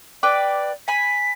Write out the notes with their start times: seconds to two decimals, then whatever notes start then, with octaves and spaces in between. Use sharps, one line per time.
0.23 B4 D5 G5 D6
0.88 G#5 B5 B6